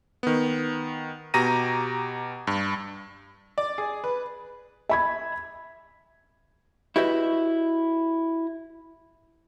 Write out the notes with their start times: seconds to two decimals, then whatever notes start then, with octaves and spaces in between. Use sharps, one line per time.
0.23 D#3 B3
1.34 B2 G4 A#5 A#6 D#7
2.47 G2
3.58 D5
3.78 G#4
4.04 B4
4.89 E5 B5 G#6
6.96 E4 F#4 G4 B4 D#5 E5